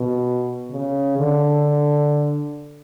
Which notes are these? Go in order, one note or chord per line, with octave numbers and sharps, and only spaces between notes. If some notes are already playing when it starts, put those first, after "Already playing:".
Already playing: B2
C#3
D3